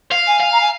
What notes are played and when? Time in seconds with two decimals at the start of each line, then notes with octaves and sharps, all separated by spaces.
0.12 F5
0.27 G#5
0.40 F5
0.52 A#5
0.61 G#5